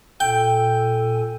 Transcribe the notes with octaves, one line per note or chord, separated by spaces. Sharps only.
A#2 A4 G5 G#5